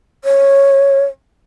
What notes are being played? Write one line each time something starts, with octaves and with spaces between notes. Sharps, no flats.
C#5